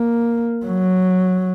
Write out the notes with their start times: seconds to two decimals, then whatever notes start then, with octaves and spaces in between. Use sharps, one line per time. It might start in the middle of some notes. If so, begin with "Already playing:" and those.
Already playing: A#3
0.66 F#3